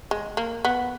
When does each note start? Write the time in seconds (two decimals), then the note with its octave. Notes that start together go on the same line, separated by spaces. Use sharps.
0.11 G#3
0.37 A#3
0.65 B3